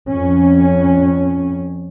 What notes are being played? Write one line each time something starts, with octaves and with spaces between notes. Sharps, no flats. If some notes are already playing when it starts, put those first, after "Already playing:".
F2 C#4